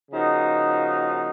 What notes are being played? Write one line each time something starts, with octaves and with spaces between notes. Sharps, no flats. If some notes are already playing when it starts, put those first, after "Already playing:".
C#3 F3 A#3 D#4 F#4